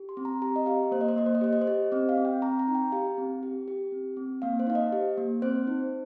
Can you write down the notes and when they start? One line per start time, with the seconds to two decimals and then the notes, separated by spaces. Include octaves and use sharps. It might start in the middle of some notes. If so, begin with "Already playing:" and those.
Already playing: G4
0.09 C6
0.17 C4
0.25 A#5
0.42 G4 A#5
0.56 D#5
0.66 G4 F5
0.91 A#3 C5
1.01 D#5
1.09 C5
1.16 A#3 D#5
1.26 C5
1.35 D#5
1.41 G4 C5
1.53 D#5
1.62 C5
1.67 G4
1.92 C4 D#5
2.09 F5
2.17 C4
2.25 G5
2.42 C4 A#5
2.59 A#5
2.68 D#4
2.75 G5
2.92 G4 F5
3.18 C4
3.43 G4
3.68 G4
3.92 C4
4.17 C4
4.42 A#3 F5
4.60 C5
4.67 D#4 F5
4.75 D#5
4.93 G4
5.18 A#3
5.42 C4 C5
5.67 D#4